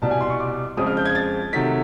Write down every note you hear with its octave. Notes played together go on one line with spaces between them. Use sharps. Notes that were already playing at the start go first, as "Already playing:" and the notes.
C2 B2 G3 A5
G#5
C6
C#6
D6
F2 C#3 F3 G#3 C4 D#6
F6
G6
G#6
A6
C3 D#3 F#3 A3 B6